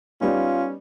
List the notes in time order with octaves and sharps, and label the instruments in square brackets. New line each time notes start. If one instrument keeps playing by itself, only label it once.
[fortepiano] G3 B3 D#4 [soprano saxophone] C#4 [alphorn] F4